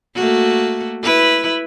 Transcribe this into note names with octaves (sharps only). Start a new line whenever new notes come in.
A3 A#3 F#4
E4 B4